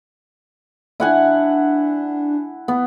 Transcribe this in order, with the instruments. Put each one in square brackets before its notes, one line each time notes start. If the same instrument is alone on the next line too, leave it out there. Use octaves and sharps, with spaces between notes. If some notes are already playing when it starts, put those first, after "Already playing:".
[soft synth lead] D4 [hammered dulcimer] E4 F#5 G#5
[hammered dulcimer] B3